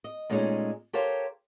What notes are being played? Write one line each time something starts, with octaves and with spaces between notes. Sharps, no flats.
D#5
A#2 G#3 A3 C#4 D#4
G4 A4 A#4 C5 C#5 F5